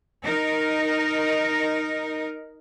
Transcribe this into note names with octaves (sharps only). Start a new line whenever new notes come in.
D#4 A#4